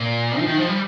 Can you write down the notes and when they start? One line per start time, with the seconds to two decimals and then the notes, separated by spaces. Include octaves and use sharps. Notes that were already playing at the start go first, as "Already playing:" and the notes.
Already playing: A#2
0.39 F3
0.46 D#3
0.57 F3
0.68 G3